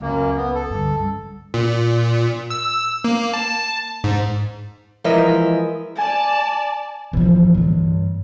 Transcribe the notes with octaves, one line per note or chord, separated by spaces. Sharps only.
C#2 F#2 A#3
B3
A4
G2 D3
G3 C#4
A#2
E6
A#3
A5
G#2
E3 F3 G#3 A#4 D#5 E5
D5 G#5 A5
A2 E3 F3 A#3
G2 D3